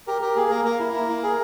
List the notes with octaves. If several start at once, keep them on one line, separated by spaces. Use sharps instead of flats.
G4 A#4
G4 A#4
A#3 G#4
A#3 A#4
A#3 A#4
E4
E4
A#3
G#4